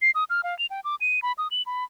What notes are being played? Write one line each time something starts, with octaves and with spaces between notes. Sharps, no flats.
C7
D#6
F6
F5
F7
G5
D6
D#7
B5
D#6
F#7
B5